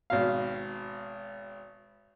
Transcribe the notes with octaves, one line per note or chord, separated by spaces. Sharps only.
G#1 B2 F5